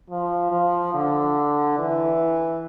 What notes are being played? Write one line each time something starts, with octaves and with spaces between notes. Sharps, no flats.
F3
F3
D3
E3